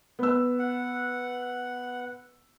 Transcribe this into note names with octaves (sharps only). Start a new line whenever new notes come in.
B3 E6
F#5